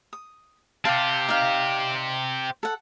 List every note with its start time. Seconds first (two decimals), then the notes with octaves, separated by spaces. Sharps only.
0.13 D#6
0.85 C4 G4 F5 A5
1.28 D#4 D5 F5
2.63 A4 F#5